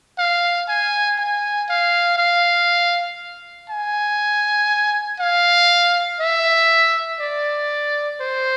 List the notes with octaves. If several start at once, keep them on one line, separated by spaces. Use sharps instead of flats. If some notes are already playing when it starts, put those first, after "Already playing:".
F5
G#5
G#5
F5
F5
G#5
F5
E5
D5
C5